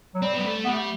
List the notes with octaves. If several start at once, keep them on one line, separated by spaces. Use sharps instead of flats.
F#3
G3 C4
G3 B3
A3
G3 B3
A3